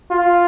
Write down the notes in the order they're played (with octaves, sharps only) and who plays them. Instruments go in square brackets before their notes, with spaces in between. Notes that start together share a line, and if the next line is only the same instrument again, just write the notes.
[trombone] F4